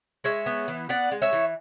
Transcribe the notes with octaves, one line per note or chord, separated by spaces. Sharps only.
G#3 C#5 E5
B3
E3
B3 D5 F#5
G#3
C#5 E5
E3